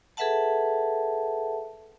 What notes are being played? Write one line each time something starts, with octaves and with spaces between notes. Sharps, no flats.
G#4 A4 B4 E5 F#5 A5